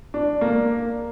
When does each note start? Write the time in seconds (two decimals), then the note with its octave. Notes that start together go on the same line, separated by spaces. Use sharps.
0.14 D4
0.41 A#3